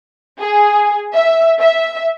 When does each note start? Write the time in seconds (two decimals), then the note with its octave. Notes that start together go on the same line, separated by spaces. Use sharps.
0.39 G#4
1.15 E5
1.60 E5